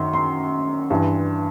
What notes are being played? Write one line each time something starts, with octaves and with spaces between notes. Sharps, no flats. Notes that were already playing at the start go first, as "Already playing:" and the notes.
Already playing: F#2 D#3 C6
C6
G2 E3